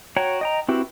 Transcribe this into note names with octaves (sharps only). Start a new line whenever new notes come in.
F#4 C#5 G5 A#5
D#5 G5 A#5
C4 E4 F#4 G4 B4